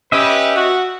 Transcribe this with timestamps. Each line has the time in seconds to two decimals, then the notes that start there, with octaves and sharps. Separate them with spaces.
0.12 C#4 G4 B4 D#5 E5
0.56 F#4